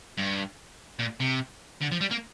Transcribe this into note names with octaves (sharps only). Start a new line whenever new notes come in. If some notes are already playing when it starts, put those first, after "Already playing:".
G2
A#2
C3
D3
F3
G3
A#3